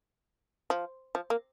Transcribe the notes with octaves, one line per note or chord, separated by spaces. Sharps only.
F3
F3
A#3